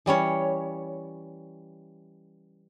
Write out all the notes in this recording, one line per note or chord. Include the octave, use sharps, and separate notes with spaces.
E3 G3 C#4 C#5